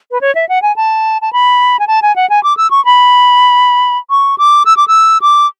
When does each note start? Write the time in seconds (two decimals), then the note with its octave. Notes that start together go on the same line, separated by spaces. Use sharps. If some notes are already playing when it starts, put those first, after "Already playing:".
0.11 B4
0.21 C#5
0.35 E5
0.49 F#5
0.62 G#5
0.76 A5
1.22 A5
1.33 B5
1.79 G#5
1.87 A5
2.02 G#5
2.16 F#5
2.30 G#5
2.43 D6
2.57 E6
2.71 C#6
2.85 B5
4.10 C#6
4.38 D6
4.66 E6
4.77 D6
4.88 E6
5.22 D6